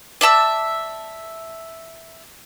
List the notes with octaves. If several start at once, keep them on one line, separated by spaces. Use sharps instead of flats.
D5 E5 A5 E6